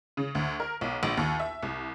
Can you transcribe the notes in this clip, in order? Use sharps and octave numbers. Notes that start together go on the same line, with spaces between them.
C#3
D2
A#4
B1
A#1
D#2
E5
C2